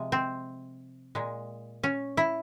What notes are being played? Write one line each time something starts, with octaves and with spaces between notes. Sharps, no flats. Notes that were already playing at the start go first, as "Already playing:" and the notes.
Already playing: C3 F3 G#3
C4
A#2 G#3
C#4
E4